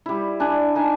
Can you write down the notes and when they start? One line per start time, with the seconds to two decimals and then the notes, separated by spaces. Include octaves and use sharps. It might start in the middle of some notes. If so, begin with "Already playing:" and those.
0.06 G3 E4
0.40 D4 G#5
0.75 D#4 G#5 A5